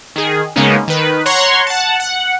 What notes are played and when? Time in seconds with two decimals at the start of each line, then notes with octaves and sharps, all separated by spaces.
0.16 D#3 G#4
0.56 C#3 G#3 A#3 B3 C#4 D#4
0.88 D#3 B4
1.26 C#5 F#5 A#5 C6 C#6
1.67 F#5 A5
2.00 F#5